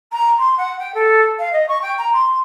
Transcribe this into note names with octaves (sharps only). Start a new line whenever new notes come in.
A#5
C6
F#5
G5
A4
F5
D#5
C#6
G5
A#5
C6